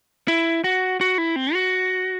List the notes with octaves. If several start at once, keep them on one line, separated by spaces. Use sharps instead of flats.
E4
F#4
F#4
E4
C4
F#4